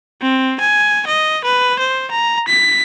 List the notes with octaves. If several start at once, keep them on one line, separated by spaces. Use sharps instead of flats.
C4
G#5
D#5
B4
C5
A#5
B6